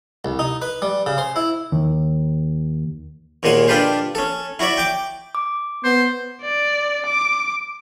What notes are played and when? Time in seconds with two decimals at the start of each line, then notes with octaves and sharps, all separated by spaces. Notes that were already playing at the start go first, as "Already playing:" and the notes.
0.25 C2
0.39 D#4
0.62 B4
0.82 G3
1.06 C#3
1.18 C5
1.36 E4
1.72 D#2
3.43 D#2 A#2 G#3 F#5 G#5
3.68 D4 F4 G4 A4 B4 C5
4.15 C#4 A4
4.59 E4 F#4 C#5 D5 E5
4.77 G5 D6
5.35 D6
5.84 B3 C5
6.42 D5
7.06 D6